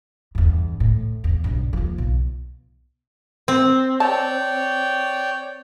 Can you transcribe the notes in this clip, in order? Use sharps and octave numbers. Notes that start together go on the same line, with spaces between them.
E2 G2
A2
E2
B1 G2
D#2 F3
B1
C4
C#5 D5 G5 A5